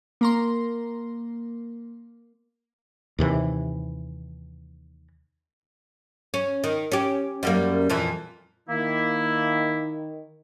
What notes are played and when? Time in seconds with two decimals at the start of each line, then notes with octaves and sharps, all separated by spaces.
0.21 A#3 A#5 C6
3.19 D#2 C3 E3
6.34 C#4
6.64 D#3
6.92 C#4 G4
7.43 F#2 G3 A#3
7.90 F2 A#2 E3
8.69 D#3 A#3 E4